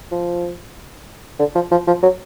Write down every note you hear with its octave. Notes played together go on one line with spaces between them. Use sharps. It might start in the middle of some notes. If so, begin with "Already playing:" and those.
F3
D3
F3
F3
F3
F#3